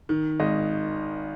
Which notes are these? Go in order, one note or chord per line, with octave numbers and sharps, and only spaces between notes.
D#3
G#1 D#5